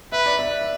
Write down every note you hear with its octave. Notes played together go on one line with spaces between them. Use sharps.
B4 E5
D5
E5